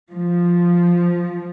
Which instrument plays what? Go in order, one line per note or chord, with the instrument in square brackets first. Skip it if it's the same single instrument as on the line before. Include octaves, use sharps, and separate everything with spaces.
[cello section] F3